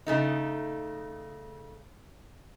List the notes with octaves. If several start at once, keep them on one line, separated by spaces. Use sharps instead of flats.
C#3 A3 D#4